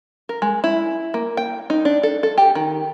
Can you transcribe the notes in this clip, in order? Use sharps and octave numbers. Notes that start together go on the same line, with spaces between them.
A#4
G#3
E4
A#3
G5
D#4
D4
A4
A4
G4
D#3